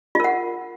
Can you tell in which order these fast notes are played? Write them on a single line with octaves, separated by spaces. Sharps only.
F4 A#4 F#5